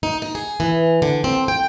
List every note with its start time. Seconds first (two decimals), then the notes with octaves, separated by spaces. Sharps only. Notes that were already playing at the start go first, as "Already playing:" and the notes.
0.03 D#4
0.22 D#4
0.35 G#4
0.60 E3
1.02 D3
1.24 C4
1.48 G5